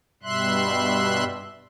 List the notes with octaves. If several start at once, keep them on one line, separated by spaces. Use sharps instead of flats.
G2 B2 G3 E5 C6 F#6